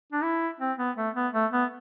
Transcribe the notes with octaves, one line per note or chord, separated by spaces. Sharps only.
D4
E4
C4
B3
A3
B3
A3
B3